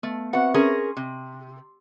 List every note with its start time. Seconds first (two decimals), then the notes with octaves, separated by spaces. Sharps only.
0.03 A3 B3
0.33 C4 F#4 B4 E5 F#5
0.54 C#4 G#4 A#4 C6
0.97 C3